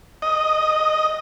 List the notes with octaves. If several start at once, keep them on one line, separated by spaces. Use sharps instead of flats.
D#5